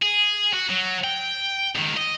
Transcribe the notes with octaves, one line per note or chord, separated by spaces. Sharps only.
G#4
F#4
F#3
G5
C#2 D#3
D#5